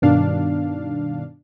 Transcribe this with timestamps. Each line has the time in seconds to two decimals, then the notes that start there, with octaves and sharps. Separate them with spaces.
0.02 G2 B2 D#3 D4 F5